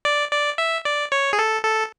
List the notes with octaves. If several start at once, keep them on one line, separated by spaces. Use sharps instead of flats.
D5
D5
E5
D5
C#5
G#4
A4
A4